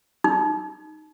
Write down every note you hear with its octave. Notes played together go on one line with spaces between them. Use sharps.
D#4